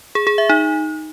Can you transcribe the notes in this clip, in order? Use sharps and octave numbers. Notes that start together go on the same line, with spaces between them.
G#4
G#4
E5
D#4